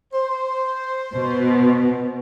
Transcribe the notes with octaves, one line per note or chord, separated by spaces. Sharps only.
C5
B2